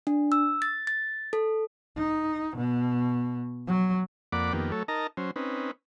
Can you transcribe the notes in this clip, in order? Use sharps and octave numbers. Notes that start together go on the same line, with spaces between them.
D4
E6
A6
A6
A4
D#4
B2
F#3
F2 A#3 D5 F#5 B5 D6
F2 D#3 A#3 B3 G4
F#3 A3 A4 C#5
D#4 A#4 D#5 A5 A#5
F#3 C#4 C5
C4 C#4 D#4 B4